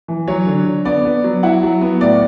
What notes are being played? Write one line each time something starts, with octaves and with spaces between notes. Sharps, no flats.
E3
F#3 C#5
D3
D3
B3 D5
B3
F#3
E4 F#5
F#3
B3
A2 D5